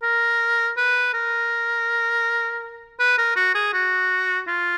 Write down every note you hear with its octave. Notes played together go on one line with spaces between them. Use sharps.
A#4
B4
A#4
B4
A#4
F#4
G#4
F#4
F4